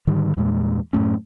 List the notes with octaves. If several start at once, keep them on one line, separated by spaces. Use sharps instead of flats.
G#2 D3 D#3 G3
E2 G2 A#2 G#3
F#2 A2 A3 C#4